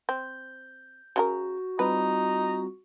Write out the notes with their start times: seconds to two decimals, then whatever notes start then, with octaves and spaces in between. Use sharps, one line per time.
0.09 C4 G6
1.16 C#3 F4 F#4 A#4
1.79 G3 C4 D#4 F4 B4